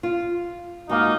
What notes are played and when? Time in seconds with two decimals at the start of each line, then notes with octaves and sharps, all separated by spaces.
0.03 F4
0.89 G#2 A#3 D#4 F#4 F5